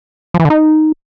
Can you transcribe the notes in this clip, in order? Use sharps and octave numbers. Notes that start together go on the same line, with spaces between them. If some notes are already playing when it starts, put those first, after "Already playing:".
F3
E3
D3
D#4